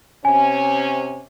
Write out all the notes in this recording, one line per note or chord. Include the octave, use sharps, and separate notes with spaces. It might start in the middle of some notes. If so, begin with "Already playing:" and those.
C3 C#4 G#5